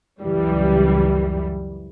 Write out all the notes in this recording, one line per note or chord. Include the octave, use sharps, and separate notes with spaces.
C#2 F#2 E3 G3